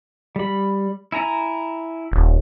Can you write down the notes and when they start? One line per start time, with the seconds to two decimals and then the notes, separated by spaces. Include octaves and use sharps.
0.36 G3 B5
1.12 E4 G#5 A#5
2.12 D#1